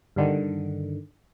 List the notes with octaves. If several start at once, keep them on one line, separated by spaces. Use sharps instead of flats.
G2 D3 D#3